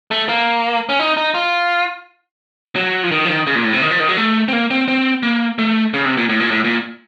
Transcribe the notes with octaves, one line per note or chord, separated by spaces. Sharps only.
A3
A#3
C#4
D#4
D#4
F4
F#3
F3
D#3
F3
D#3
C#3
A#2
A2
C3
D#3
F3
D#3
F#3
A3
C4
A#3
C4
C4
A#3
A3
C#3
C3
A#2
A2
A#2
A2
A#2